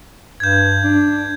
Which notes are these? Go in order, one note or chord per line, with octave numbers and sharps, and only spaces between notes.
G2 G6 G#6
D4